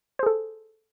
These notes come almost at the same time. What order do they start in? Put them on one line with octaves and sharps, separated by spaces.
C5 G#4 A4